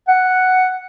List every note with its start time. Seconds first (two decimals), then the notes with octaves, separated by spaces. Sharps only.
0.08 F#5